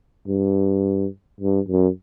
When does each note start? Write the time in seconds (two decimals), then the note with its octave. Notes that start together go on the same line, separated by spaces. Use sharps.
0.28 G2
1.41 G2
1.68 F#2